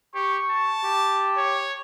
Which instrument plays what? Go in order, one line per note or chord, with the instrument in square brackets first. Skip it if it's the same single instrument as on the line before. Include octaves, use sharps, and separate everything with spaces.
[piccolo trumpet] G4 [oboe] C#6
[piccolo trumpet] A5
[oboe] G4
[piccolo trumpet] C#5